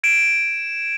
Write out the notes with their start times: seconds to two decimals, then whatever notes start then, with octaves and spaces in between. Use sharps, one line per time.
0.03 G#6 D7 E7